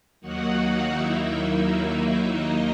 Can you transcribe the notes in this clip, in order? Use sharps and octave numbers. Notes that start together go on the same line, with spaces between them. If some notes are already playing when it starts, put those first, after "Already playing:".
D#2 D#3 F#3 A#3 D#4 F#4 F#5
E4 E5
D#4 D#5